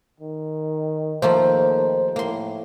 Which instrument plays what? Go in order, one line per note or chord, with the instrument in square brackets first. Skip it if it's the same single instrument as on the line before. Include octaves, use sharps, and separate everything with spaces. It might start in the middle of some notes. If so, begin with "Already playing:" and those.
[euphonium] D#3
[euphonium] D#2 [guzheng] F3 A3 A#3 [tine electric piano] C5
[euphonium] A2 [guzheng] A#3 C6